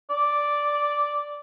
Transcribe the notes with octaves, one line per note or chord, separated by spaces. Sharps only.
D5